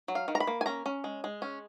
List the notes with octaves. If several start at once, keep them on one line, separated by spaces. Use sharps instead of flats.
F#3
F5
D#3
A#5
B5
A#3
G#5
C#4 A#5
C#4
G#3
G#3
C#4